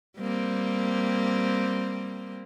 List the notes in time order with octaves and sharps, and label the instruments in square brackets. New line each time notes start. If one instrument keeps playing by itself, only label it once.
[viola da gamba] G3 A#3 C4